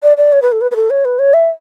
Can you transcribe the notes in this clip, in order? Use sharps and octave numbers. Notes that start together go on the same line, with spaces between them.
D5
D5
C#5
B4
A4
B4
B4
A4
C#5
B4
C#5
E5